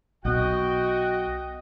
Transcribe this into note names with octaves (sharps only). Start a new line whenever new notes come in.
B1 B2 F#4 D#5 G5